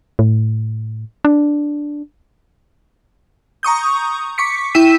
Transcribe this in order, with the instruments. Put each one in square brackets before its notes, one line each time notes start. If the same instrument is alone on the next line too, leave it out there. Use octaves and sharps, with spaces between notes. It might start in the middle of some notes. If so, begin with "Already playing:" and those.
[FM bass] A2
D4
[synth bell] A#5 C#6 D#6 G6
C#6 D6 B6 C#7
E4 G5 E6 B6 D#7